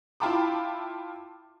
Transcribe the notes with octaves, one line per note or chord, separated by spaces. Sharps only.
E4 F4 G5 A5 B5 D6